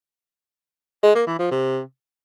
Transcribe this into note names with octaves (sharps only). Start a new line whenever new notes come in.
G#3
A#3
E3
F3
C3